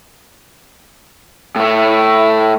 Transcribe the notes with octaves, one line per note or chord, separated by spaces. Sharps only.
A2 A3